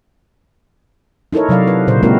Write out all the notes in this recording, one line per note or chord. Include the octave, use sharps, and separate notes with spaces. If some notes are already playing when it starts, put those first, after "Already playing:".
D#4 E4 A4 A#4 C#5
C3 F#3 D5 F5
B4
A#2 C#3 C5
G#3 A#3 C4 E4 F#4 A#4